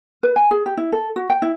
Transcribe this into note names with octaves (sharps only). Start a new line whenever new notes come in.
B4
G#5
G#4
G4
E4
A4
F#4
G5
E4